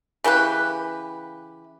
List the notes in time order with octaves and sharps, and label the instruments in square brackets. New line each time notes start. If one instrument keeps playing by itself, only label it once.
[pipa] C#3 E3 G4 B4